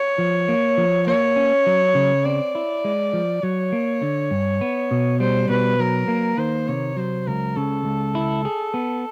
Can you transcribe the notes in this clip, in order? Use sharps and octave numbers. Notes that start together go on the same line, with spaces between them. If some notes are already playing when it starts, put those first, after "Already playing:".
Already playing: C#5
F3
A#3
F3
A#3 C#5
C#4
F#3
C#3
C4 D5
E4
G#3
F3
F#3 C#5
A#3
D3
G2
B3
B2
G3 C5
B2 B4
F#3 A#4
A#3
D#3 C5
C3 C#5
F#3 C5
C#2 A#4
C#3 A4
C#2
E4
G#4
B3